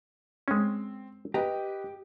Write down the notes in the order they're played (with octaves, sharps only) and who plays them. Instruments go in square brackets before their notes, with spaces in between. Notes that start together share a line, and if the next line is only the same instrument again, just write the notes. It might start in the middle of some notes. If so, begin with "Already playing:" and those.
[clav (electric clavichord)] G#3 C#4 [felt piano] C4
[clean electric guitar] G4 [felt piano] B4 D#5 G5 [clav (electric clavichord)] A#5